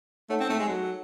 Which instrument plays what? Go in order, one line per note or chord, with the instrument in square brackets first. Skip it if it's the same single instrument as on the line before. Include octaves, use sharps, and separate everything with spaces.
[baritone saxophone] A3 [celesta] D#4 A4 C#5 F#5 A5
[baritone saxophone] C4
A3
G#3
F#3